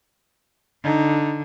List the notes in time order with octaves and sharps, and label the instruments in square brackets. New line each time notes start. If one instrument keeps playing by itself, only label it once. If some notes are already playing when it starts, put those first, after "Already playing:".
[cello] D3 [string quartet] D#4